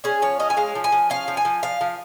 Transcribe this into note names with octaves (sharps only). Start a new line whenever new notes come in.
C#4 G#4
F3 C#5
C#4 D#5
G#5
G#3 F5
F3
G#5
F3
C#4 F5
F3
G#5
F3
F3 F5
F3